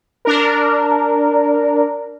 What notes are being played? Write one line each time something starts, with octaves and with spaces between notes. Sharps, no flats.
D4 A#4